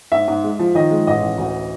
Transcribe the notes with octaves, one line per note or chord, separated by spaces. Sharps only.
G#2 E5
G#2
G#3
F3
D#3 D#5
G#3
A1 D#5
A1
D2